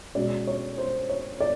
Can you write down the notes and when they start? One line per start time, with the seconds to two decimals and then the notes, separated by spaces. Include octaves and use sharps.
0.15 B2 G#3 C#4 D5
0.47 C#5
0.78 C5
1.10 C#5
1.40 D5